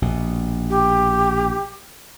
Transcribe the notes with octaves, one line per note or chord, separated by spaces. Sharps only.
A#1 B2
G4